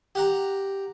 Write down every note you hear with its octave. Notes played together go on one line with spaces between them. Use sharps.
G4 F#5 A#5